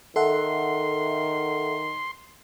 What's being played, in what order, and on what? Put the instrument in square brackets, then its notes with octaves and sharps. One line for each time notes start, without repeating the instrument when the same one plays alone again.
[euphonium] D#3 [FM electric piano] A4 E5 F#5 [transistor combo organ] C6